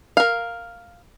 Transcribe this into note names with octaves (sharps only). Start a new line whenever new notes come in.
A#4 F5